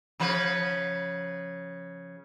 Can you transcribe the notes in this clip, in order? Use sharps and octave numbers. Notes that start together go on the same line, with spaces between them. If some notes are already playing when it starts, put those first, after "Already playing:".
C#3 F3 B4